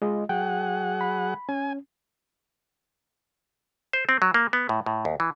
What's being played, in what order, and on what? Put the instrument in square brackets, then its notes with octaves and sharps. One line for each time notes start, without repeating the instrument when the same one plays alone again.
[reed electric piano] G#3 F4 D#5
[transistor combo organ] F#3 G#4 F#5 [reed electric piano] G5
[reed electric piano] B5
[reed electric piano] C#4 [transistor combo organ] G#5
[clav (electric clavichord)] C5
C4
F#3
A#3
B3
A2
A2
D#2
E3